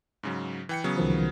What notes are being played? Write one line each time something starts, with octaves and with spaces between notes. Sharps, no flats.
G#2 C#3 F#3
E3 G5 C#7
C#3 F#3 B3
C2 D#3 F3